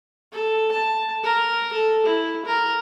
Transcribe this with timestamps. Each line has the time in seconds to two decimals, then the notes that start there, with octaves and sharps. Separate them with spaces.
0.32 A4
0.72 A5
1.23 A#4
1.73 A4
2.06 E4
2.45 A#4